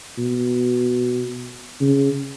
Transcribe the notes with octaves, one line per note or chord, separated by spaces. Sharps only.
B2
C#3